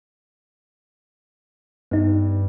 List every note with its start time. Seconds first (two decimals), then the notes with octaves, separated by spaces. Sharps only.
1.91 G2 B3 D#4